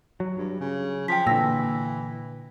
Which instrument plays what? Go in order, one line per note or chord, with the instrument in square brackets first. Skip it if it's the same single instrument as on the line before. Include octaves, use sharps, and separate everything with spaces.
[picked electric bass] F#3
[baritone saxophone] G2
C#3
[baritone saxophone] F3 [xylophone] G5 B6
[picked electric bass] A#2 D3 [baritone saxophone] E3 [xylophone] E6 A#6